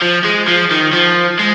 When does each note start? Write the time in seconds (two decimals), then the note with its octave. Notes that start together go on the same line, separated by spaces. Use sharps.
0.02 F3
0.24 G#3
0.48 F3
0.71 D#3
0.93 F3
1.39 G#3